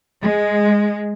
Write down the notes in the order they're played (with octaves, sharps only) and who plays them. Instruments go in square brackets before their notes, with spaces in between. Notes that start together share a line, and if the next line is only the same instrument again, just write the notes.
[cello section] G#3